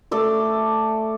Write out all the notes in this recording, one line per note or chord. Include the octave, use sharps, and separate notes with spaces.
A3 A4 D5 E5